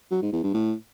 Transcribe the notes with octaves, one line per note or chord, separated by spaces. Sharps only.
F#3
G#2
E2
G2
A2